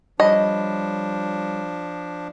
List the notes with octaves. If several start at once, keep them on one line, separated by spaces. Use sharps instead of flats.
F3 G3 D4 C#5 D#5 B5